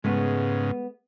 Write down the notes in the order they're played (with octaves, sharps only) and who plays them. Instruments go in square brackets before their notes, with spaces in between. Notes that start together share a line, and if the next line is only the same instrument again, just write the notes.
[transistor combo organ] G#2 C#3 [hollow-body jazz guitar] G#3 A3 B3